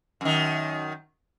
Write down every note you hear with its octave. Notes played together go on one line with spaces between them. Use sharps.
F#2 D#3